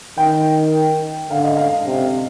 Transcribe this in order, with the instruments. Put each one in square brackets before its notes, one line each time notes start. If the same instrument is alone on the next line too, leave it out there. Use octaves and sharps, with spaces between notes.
[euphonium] D#3 [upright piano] G5
[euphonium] D3 [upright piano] F5
[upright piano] D#5
F5
[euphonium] C3